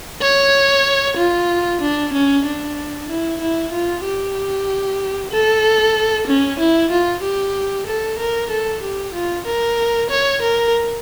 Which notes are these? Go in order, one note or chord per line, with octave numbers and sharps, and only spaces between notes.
C#5
F4
D4
C#4
D4
E4
E4
F4
G4
A4
C#4
E4
F4
G4
A4
A#4
A4
G4
F4
A#4
C#5
A#4